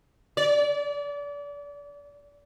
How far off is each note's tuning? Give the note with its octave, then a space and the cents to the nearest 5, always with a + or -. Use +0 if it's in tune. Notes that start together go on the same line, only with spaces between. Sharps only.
D5 -30